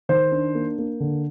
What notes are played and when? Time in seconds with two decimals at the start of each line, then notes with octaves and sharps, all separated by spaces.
0.09 D#3 C5
0.32 D4
0.55 A#3
0.78 A#3
1.00 D3